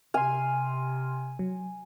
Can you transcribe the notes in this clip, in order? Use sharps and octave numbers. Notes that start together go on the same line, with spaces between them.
C3 G#5 C6 F6
F#3